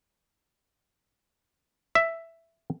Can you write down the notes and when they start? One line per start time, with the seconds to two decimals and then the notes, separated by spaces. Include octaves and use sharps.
1.95 E5